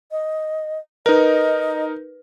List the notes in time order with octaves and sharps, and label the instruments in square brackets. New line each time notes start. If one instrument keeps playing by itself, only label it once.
[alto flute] D#5
[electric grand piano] D#4 A#4 [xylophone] B4 [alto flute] D#5